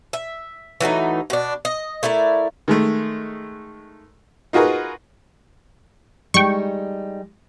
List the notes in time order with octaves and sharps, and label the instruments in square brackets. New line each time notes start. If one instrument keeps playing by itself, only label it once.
[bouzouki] E5
E3 F#3 A3 D#4
B2 D4
D#5
A3 E4 A#4 D5
[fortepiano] D#3 G#3 A3
D#4 F4 F#4 G#4 A#4 B4
[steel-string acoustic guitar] G3 G#3 D#4 [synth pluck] G5 C#6